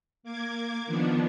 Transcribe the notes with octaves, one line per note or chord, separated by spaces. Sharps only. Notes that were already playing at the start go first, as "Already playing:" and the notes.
A#3 D6 G#6
D#3 F3 B3 D4